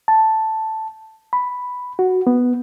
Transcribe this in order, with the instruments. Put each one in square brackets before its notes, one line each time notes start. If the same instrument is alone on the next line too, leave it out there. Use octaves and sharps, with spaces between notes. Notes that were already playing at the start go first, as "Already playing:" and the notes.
[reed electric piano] A5
B5
F#4
B3